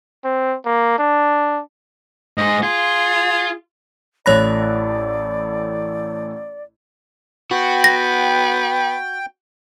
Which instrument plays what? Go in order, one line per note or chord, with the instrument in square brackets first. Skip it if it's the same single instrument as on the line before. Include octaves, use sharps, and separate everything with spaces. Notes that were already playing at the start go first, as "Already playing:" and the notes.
[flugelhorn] C4
A#3
D4
[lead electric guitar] G#2 G#4 [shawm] D#5
[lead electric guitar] F4 [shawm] G#4
[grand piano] A1 A2 B5 [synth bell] C#5 F#6 A#6 [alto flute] D5
[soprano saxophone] B3 [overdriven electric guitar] F#4 [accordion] G5
[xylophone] A#6